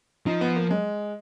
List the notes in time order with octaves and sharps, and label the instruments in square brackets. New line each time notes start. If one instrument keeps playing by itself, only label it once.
[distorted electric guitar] F3 [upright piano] D#4
[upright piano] B3
A#3
G#3